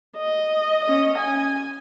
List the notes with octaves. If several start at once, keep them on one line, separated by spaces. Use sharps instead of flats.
D#5
C#4 D#5
G#5